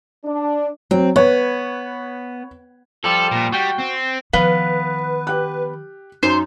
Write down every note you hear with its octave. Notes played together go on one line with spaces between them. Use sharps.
D4
F#3 C4
B3 B4 C#5
F3 G3 A4
A#2
G3 F#4 G5
C4
D#3 F3 B3 B4 F5
G4 F#6
F#2 D#4 C5